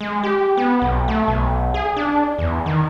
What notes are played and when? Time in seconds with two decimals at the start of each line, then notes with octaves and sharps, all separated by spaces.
0.01 G#3
0.23 G4
0.57 B3
0.82 B1
1.08 A3
1.28 B1
1.74 G#4
1.96 D4
2.38 E2
2.66 D#3